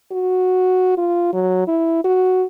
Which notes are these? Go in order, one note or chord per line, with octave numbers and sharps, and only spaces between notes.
F#4
F4
F#3
E4
F#4